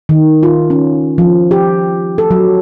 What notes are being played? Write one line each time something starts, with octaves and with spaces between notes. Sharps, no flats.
D#3
F4
C#4
F3
G4
A4
F#3